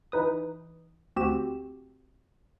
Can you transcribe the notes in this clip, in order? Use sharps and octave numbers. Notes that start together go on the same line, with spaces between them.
E3 D#4 B4 D#6
D2 C4 F#4 G4 E7